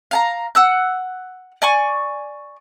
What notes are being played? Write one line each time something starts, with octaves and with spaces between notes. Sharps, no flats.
F5 A5 A#5
F#5 E6 F#6
D5 G#5 C#6